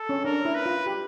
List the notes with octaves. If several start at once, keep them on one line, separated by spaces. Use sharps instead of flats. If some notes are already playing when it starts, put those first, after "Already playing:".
Already playing: A4
C#4
D4 A#4
E4
B4
F4
G4